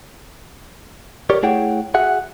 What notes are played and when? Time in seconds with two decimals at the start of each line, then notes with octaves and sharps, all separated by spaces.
1.30 G4 A#4 C#5 D5
1.43 A3 E4 G#4 C#5 F#5 G5
1.94 F#4 G#4 E5 F#5